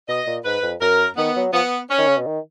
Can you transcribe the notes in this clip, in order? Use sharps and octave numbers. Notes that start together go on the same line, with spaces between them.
B2 D#5
A#2
G#2 B4
F2
F#2 A#4
D#3 B3
F#3
F3 B3
C#4
D#3
C#3
B2
D#3